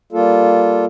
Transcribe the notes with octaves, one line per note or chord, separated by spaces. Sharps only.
G3 A#3 F4 A4